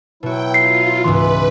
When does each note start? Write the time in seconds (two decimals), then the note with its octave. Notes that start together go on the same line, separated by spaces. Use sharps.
0.23 B2 F#3 E4 F#4 G5
0.54 F4 C7
1.04 C#2 G#2 E3 B4 C6